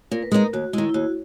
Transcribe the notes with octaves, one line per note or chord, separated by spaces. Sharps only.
A#2 A#4
B4
G#3 B3 D#4 A#4
D#2 F#4
D#3 G#3 E4
E4
D#2 F#4